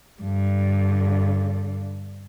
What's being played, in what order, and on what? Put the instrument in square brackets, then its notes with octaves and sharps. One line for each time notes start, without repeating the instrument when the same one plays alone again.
[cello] G2 D3